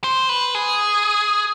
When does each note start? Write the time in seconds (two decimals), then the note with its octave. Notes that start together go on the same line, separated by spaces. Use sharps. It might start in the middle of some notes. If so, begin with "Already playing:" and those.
0.04 C5
0.29 B4
0.55 G#4